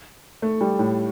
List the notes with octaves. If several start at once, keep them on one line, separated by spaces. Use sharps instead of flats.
A3
G3
A2